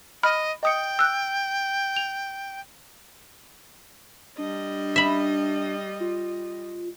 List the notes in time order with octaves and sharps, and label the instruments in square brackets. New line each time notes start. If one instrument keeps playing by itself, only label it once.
[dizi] D#5 [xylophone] B5 F6
[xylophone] D#5 D#6 C#7 [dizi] G5
[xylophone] E6 F#6
F7
[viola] G3 D#5 [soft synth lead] D4
[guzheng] E5 B5
[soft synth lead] F4